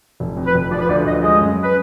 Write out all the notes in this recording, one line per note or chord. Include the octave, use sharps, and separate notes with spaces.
F1
F2
B4
F1
F3 D5
B4
D2 D5
F3 D#5
G#3 D#5
F#2
B4